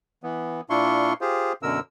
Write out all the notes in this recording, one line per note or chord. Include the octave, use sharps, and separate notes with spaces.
E3 B3
A#2 D4 E4 F4 C6 C#6
F4 G4 G#4 C5
F#2 B2 D3 A#4 E6